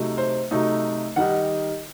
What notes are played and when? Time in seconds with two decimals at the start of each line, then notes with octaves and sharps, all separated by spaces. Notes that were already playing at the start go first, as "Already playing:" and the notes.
Already playing: C3 F#3 A3 D#4
0.18 C5
0.51 C3 F#3 A3 D#4
1.16 D#3 G3 D#4 F#5